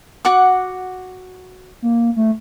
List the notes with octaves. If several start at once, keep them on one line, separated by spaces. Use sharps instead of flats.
F#4 F#5 D6
A#3
A3